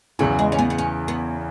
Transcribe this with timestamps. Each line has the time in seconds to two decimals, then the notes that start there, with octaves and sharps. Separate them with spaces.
0.19 E2 C#3 E3 F#3
0.39 G#3
0.52 C#4
0.59 B3
0.70 B3
0.78 C#4
1.08 B3